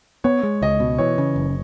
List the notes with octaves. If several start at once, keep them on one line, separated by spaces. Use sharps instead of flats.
B3 C#5
G#3
C#2 D#5
B2
E3 C#5
C#3
F#1